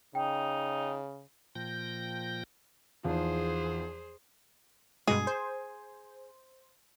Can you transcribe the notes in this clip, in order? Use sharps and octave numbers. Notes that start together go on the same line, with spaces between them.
C#3 D#4 G5
A#2 F3 G5 G6 A#6
E2 F3 D#4 G#4 C5
G2 B2 G#3 G#4
C5